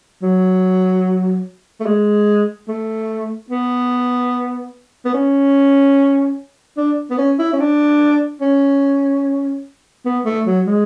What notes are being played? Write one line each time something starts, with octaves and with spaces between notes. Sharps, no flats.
F#3
A3
G#3
A3
B3
B3
C#4
D4
B3
C#4
E4
C#4
D4
C#4
B3
A3
F#3
G#3